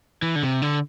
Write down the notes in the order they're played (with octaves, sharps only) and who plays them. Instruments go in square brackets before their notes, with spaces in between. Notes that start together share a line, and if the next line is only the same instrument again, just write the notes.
[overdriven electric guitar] E3
D3
C3
D3